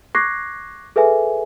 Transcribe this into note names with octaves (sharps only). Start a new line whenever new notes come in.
C#6 D6 F#6 G#6 A#6 C7
G#4 A4 B4 E5 G#5